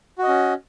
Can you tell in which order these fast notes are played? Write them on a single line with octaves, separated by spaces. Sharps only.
F#4 D#5 C#4